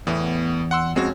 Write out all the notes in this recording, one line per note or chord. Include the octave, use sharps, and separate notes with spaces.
E2 A2 B3
F#5 C6 E6
F2 G#3 C4 C#4 F#4